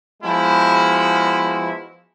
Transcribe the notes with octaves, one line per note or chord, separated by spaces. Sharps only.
F3 G#3 B3 E4 F#4